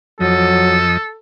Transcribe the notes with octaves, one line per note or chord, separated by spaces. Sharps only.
F2 F3 F#3 A4 D#5